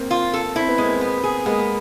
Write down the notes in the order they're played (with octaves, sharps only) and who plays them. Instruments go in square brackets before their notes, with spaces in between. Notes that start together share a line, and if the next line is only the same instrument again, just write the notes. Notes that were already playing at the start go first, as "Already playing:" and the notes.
Already playing: [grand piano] A#3 C4
[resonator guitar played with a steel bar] F4
A4
[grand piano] C4 [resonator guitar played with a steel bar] E4
[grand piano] B3
[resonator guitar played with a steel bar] G#3 [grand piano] A#3 C4
[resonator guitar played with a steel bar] B3
G#4
[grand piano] G#3 A#3 [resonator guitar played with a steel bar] B3